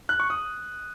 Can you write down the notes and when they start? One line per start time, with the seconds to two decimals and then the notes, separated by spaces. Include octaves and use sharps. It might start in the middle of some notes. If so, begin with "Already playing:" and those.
0.09 F#6
0.20 C#6
0.30 D#6